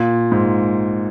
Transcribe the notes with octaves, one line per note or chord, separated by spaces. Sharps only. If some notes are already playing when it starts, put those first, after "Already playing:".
Already playing: A#2
G#2